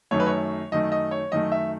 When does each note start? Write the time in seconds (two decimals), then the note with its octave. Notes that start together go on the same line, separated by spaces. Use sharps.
0.11 F#2 D#3 A3 C#5
0.20 B4
0.26 C#5
0.72 F#2 D#3 A3 D#5
0.92 D#5
1.11 C#5
1.32 F#2 D#3 A3 D#5
1.52 E5